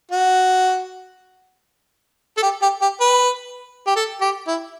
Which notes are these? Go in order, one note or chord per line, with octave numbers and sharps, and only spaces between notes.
F#4
A4
G4
G4
G4
B4
G4
A4
G4
E4